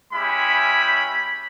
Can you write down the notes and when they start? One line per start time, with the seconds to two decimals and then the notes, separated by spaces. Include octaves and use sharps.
0.13 G#3 C#4 E4 G4 B5